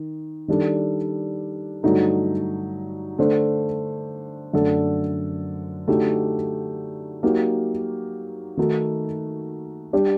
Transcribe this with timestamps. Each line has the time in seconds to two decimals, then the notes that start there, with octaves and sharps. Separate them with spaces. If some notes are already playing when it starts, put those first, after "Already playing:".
Already playing: D#3
0.48 D#3 G3 D4 A4
1.83 G2 D3 F#3 A3 D#4
3.18 D3 A3 D4 A4 C5
4.53 F#2 D3 A3 D4 A4
5.88 D3 F#3 A3 D#4 G4
7.23 F#3 A#3 D#4 G4
8.57 D#3 A3 D#4 F#4
9.93 G3 D4 G4 D5